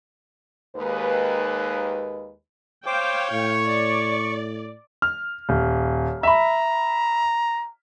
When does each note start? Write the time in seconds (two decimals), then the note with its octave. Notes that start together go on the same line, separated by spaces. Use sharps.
0.76 D#2 G#3 B4
2.86 C5 C#5 F5 G5 D6
3.32 A2 C#6
3.65 D5
5.02 F6
5.49 D#1
6.23 E5 A#5 B5